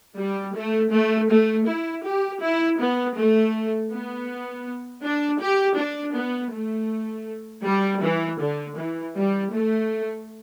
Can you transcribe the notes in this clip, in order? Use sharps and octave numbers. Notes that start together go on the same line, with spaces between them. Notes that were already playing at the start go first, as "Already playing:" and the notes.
G3
A3
A3
A3
E4
G4
E4
B3
A3
B3
D4
G4
D4
B3
A3
G3
E3
D3
E3
G3
A3